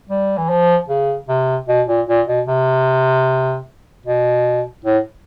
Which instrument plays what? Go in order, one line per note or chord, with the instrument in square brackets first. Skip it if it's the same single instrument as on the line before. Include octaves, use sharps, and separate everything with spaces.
[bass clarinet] G3
E3
F3
C#3
C3
B2
A#2
A#2
B2
C3
B2
A2